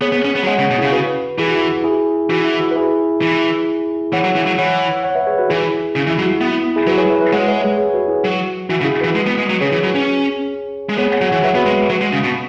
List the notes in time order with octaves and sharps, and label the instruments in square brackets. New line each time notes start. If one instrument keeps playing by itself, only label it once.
[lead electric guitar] B3 [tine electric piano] G#4 C#5
[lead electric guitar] B3
C#4
B3
F#3
[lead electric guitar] G#3 [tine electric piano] C#5 F#5
[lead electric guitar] C#3
B2
[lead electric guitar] C#3 [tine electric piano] E4 G#4
[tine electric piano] F#4 B4
[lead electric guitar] E3 [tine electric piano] E4 G#4
[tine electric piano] F#4
F#4
E4 G#4
[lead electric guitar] E3 [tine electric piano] F#4
[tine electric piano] E4
F#4
B4
E4 G#4
[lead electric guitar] E3
[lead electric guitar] E3 [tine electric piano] C#5 F#5
[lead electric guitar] F#3
E3
F#3
[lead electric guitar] E3 [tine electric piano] C#5 F#5
[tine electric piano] C#5 F#5
B4 E5
G#4 C#5
F#4 B4
[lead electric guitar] E3 [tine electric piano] E4 G#4
[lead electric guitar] C#3
E3
[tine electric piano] E4
[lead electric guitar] F#3
[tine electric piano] F#4
[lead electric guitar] B3 [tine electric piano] E4
[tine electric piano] E4
E4 G#4
[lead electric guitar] F#3 [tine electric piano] F#4 B4
[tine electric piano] G#4 C#5
B4 E5
B4 E5
[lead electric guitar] G#3 [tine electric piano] C#5 F#5
[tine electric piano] B4 E5
G#4 C#5
G#4 C#5
F#4 B4
E4 G#4
[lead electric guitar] F#3 [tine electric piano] F#4
[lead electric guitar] E3 [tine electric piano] F#4
[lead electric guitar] C#3
[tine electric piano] E4 G#4
[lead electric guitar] E3 [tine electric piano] F#4 B4
[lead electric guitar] G#3
B3
G#3
F#3
[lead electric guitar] C#3 [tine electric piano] G#4 C#5
[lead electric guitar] E3
F#3
C#4
G#3
[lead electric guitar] B3 [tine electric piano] G#4 C#5
[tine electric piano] C#5 F#5
[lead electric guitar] F#3
[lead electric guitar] E3 [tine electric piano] C#5 F#5
[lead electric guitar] F#3 [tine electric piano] B4 E5
[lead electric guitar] B3 [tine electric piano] F#4 B4
[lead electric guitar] G#3 [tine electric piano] F#4 B4
[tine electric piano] F#4
[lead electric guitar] F#3 [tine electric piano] F#4
[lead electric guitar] G#3
C#3
B2